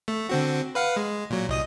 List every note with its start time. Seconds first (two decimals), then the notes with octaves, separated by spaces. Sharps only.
0.08 A3
0.29 D3 C4 F#4
0.75 B4 F5 F#5
0.96 G#3
1.30 A#2 F#3
1.49 C2 D#5 D#6